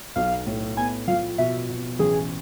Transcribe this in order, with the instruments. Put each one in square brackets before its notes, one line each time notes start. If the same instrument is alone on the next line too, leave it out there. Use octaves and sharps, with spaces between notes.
[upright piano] B1 [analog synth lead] F5
[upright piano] A2
[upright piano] B3 [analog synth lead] G#5
[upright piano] F3 [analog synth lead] F5
[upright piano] B2 [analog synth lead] E5
[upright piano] B2
[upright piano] A1 [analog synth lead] G#4